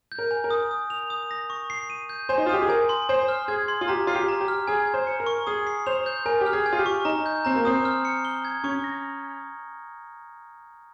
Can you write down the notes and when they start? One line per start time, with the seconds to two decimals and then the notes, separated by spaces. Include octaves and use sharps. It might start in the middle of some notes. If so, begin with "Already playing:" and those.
0.12 G6
0.18 A#4
0.31 G#5
0.44 A#4
0.51 D#6
0.71 D#6
0.90 F7
1.10 D#6
1.31 A#6
1.50 C#6
1.70 C7
1.90 D#7
2.09 G6
2.29 C5 G#5
2.38 D#4
2.46 F4
2.49 G4 D#6
2.62 G#4
2.69 A#4 G#5
2.89 C6
3.09 C5 G#5
3.28 F6
3.48 G#4 G#6
3.68 C6
3.81 F4
3.88 G4 A#5
4.07 F4 C7
4.15 G4
4.28 A#5
4.40 G4
4.48 F6
4.68 G#4 G#5
4.87 G#6
4.94 C5
5.07 C#7
5.20 A#4
5.26 C#6
5.47 G#4 D#6
5.67 C7
5.86 C5 F7
6.06 G6
6.26 A#4 G#5
6.41 G4
6.46 F6
6.53 G#4
6.66 G#5
6.73 F4
6.79 G4
6.86 C#6
7.05 D#4 A#5
7.26 G6
7.45 C4 A#5
7.55 A#3
7.65 C4 D#6
7.85 F6
8.05 C#7
8.25 G7
8.45 G#6
8.64 C#4 C#6
8.84 A#6